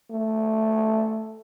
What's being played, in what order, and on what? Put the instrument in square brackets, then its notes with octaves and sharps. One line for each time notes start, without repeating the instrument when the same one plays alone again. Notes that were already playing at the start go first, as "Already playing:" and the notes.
[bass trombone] A3